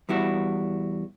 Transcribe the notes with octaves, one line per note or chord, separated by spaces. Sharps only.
E2 G3 E4 F#4